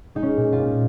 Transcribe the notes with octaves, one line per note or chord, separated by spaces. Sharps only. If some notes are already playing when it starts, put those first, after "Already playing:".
G#3 D#4
C#4
A#2
F4
A#2